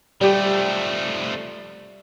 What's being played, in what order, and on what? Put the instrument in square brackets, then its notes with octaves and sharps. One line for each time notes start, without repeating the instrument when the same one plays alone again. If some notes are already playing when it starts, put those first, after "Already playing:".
[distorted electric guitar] F3 A3 [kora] G3 G4